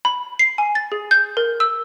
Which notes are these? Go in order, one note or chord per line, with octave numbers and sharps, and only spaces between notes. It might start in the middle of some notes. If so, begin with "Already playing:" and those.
B5
C7
G#5
A6
G#4
G6
A#4
E6